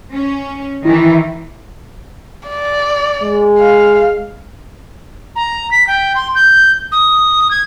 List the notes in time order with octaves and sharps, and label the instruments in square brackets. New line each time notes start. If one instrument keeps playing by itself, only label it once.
[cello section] C#4
[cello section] D#3 E3 [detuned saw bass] E4
[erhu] D5
[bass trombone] G#3
[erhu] F5
[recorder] A#5
B6
G5
C6
G6
D#6
G#6